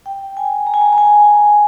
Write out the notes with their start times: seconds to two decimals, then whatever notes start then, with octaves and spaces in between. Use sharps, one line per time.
0.06 G5
0.37 G#5
0.67 A#5
0.74 G#5
0.81 A#5
0.93 A#5
0.98 G#5